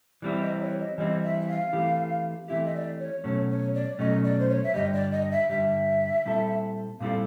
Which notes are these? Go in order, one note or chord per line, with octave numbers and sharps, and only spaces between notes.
E3 G3 C4 E4 D5
D#5
C#5
D#5
E3 G3 C4 E4 D#5
E5
E5
F5
E3 A3 C4 E4 G4
E3 A3 C4 E4 G4 E5
D#5
D5
C#5
B2 F#3 A3 C#4 C#5
C#5
D5
B2 F#3 A3 C#4 D#5
D5
C5
C#5
E5
G2 D3 G3 D#5
D5
D#5
E5
G2 D3 G3 E5
A#2 G3 C4 E4 A4
A#2 G3 C4 E4 A4 F5